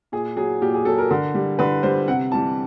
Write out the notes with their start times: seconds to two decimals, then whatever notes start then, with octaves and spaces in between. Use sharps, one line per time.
0.12 A#2 G#4
0.36 F#3 G#4
0.61 A#2 G4
0.74 G#4
0.85 F#3 A4
0.98 A#4
1.11 D3
1.34 G3
1.59 D3 B4
1.83 G3 C5
2.08 C3 F#5
2.32 E3 G3 A5